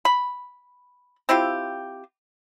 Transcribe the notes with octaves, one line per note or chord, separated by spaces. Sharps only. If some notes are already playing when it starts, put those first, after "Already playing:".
B5
C4 E4 F4 G4